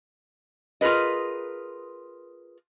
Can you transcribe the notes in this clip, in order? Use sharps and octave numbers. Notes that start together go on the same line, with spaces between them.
F4 G#4 A#4 B4 D#5